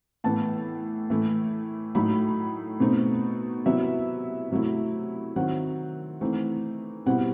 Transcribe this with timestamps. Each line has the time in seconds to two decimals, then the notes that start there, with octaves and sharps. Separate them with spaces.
0.24 A2 E3 B3 E4 A5
1.10 A2 E3 A3 E4
1.95 A2 F#3 A3 D#4 B5
2.80 B2 A3 C4 D#4
3.65 C3 F#3 B3 E4 E5
4.50 C3 F#3 A3 E4
5.36 D#3 F#3 C4 F#5
6.21 E3 A3 C4 D#4
7.06 B2 G3 C4 E4 F#5